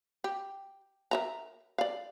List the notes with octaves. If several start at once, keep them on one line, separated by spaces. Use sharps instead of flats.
G4
A#4 E5 A#5
D5 F5